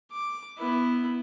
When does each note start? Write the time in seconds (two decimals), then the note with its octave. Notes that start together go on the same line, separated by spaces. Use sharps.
0.11 D6
0.58 B3 E4